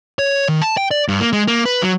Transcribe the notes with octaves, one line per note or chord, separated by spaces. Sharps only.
C#5
D#3
A5
G5
D5
G2
A#3
G#3
A#3
B4
F#3